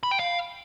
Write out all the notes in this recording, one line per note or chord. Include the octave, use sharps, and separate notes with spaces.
B5
G5
F5